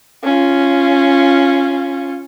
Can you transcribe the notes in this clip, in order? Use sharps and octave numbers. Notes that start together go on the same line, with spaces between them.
C#4 F4